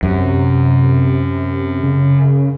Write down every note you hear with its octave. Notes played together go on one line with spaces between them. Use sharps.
F#2 C3
C#3